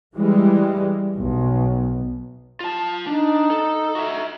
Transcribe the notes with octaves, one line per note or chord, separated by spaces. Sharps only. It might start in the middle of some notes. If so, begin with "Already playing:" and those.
E3 G3 G#3
B1
F4 A5
D4 D#4
A4
F#4 E5